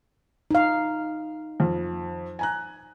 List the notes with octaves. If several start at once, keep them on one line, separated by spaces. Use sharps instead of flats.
D#4 F5
F2
G#5 A#5 F#6